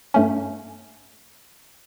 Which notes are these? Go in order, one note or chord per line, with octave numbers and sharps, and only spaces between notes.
G2 A3 C#4